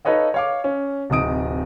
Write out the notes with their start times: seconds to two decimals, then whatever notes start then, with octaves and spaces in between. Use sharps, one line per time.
0.05 D#4 A4 B4 C#5 D#5 F5
0.34 C#5 F5 D6
0.64 C#4
1.10 D1 C3 D#4 D#6 D7